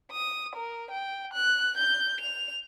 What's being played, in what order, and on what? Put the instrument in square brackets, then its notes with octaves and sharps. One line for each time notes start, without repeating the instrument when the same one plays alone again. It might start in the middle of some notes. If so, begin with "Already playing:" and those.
[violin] D#6
A#4
G5
F#6
G6
F7